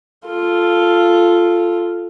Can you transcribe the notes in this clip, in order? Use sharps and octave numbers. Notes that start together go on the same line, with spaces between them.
F4 A4